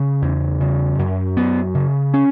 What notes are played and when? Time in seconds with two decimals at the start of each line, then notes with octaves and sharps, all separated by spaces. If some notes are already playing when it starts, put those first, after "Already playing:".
Already playing: C#3 C#4
0.22 E2
0.60 C#3
0.99 F#2
1.37 F#2 B3
1.74 C#3
2.14 C#4